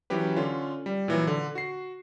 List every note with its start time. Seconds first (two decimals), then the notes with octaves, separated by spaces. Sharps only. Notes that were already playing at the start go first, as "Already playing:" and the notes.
0.10 E3 F#3 C#4 G4 B4
0.36 D3 C#4 F4
0.86 G3
1.08 A#2 E3 F#3
1.27 D3
1.55 F#4 C7